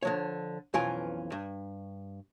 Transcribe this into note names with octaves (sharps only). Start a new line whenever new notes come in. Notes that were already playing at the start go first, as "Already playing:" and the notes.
D3 F3 C#5
B1 F2 E3 C#4 F4 G#5
G2